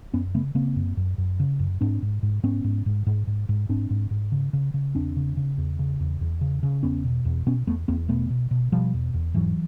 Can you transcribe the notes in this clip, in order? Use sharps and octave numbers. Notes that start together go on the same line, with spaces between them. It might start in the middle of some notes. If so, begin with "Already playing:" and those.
F#2 B3 C#4
C#3 A3 B3
C#3 A#3 C4
F#2
F#2
F#2
C#3
F#2
G#2 C4 D4
G#2
G#2
G#2 B3 C#4
G#2
G#2
G#2
G#2
G#2
G#2 C4 D4
G#2
G#2
C#3
C#3
C#3
E2 C4 D4
C#3
C#3
E2
C#3
E2
E2
C#3
C#3
E2 B3 C#4
B2
E2
B2 B3 C#4
E2 A3 B3
E2 A#3 C4
B2 A3 B3
B2
B2
B2 F3 G3
E2
E2
G#2 E3 F#3